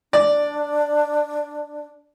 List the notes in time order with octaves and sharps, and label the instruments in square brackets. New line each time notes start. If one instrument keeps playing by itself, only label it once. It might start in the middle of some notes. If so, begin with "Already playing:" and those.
[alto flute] D4 [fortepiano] D5